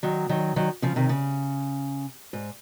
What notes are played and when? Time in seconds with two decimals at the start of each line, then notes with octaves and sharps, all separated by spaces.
0.03 D#3 F#3
0.29 D#3 F#3
0.56 D#3 F#3
0.82 C#3 F3
0.96 C3 D#3
1.09 C#3
2.33 G#2